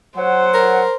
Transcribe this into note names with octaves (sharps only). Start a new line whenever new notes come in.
F#3 C5 F#5
A#4